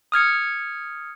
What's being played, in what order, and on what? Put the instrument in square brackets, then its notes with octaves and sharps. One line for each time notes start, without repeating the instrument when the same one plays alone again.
[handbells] D#6 F6 G#6 C#7